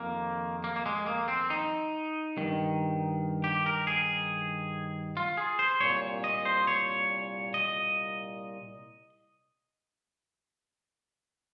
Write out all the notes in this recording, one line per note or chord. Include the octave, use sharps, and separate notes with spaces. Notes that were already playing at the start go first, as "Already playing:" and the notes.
Already playing: F2 C3 D#3 A#3
A#3
A#3
G#3
A#3
C4
D#4
G2 D#3
G4
A#4
G#4
F4
G#4
C5
C2 A#2 C#5
D#5
C5
C#5
D#5